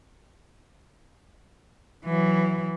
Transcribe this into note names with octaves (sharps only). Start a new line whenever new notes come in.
E3 F#3